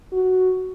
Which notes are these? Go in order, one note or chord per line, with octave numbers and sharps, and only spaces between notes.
F#4